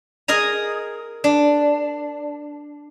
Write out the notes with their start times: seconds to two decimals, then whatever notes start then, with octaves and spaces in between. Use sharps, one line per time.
0.28 G#4 A#4 D#5 G#5 A#5
1.24 D4